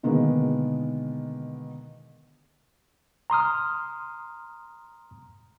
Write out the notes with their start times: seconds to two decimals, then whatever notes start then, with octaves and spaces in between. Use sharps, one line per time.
0.03 B2 D3 D#3 G#3 A#3 B3
3.30 A#5 C6 D#6 F6